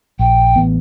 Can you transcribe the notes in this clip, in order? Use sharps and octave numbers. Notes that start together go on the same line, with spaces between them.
A#1 G5
A1 E3 B3